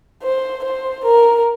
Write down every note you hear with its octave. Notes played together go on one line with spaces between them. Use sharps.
C5
C5
A#4